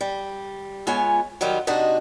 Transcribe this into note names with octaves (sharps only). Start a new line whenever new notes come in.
G3
G#3 B3 F4 C#5 G#5
D#3 F#3 G3 F4
C3 D4 D#4 F#4 D#5